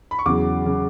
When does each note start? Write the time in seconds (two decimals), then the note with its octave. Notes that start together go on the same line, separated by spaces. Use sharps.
0.11 B5
0.19 C#6
0.26 E2 C#3 F#3 D6
0.66 C#3 F#3